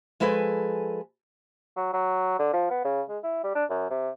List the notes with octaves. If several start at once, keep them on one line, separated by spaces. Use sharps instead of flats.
F3 G#3 A4 B4 F5 G#5
F#3
F#3
D3
F3
B3
C#3
G#3
E4
G3
D4
F#2
C3